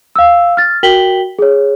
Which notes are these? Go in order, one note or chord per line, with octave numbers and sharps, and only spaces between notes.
F5 E6
F6 A6
F#4 A#4 G5 B6 F#7 G7
G#4 C#5